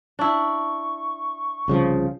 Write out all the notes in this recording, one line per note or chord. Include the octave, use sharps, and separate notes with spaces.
D4 E4 C#6
C2 C#3 F3